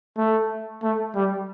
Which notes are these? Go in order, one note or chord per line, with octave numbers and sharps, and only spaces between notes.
A3
A3
G3